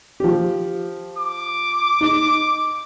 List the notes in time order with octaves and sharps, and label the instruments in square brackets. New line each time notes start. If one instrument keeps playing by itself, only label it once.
[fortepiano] F3 G4
[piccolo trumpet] D6
[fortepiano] D#4